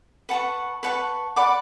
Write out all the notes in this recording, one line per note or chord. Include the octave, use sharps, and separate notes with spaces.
B4 F#5 A5 C#6
B4 F#5 A5 C#6
D5 F#5 B5 D6